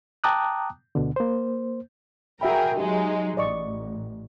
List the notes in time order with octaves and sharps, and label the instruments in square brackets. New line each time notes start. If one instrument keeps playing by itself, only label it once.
[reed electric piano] G5 A5 A#5 D6 D#6 F#6
D2 B2 D3
A#3 C5
[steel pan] F#4 E5 B5 [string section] G#4 A#4 G5
[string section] F#3 G#3 D#4 [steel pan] G4
[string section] A1 [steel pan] D5 D#5 C#6